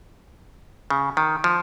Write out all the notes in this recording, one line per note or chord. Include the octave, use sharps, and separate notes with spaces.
C#3
D#3
F3